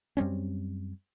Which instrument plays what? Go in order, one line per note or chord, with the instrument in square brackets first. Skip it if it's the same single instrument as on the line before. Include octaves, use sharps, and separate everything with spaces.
[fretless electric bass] F#2 G3 C4 C#4